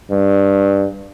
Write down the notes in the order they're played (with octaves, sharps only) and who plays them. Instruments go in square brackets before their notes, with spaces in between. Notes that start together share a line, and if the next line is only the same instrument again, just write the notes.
[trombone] G2